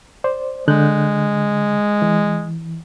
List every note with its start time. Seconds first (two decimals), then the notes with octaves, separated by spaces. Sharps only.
0.24 C5 D5
0.68 D3 G#3 F#6 G6
2.02 E3